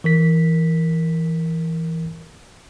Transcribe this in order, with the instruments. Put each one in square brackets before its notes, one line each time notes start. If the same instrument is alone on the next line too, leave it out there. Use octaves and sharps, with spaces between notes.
[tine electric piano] E3 A#4 B6